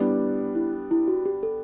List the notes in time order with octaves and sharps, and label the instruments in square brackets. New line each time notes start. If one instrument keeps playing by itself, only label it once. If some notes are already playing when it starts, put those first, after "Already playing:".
Already playing: [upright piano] G3 B3 D4 [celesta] E4
[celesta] E4
E4
F#4
G4
A4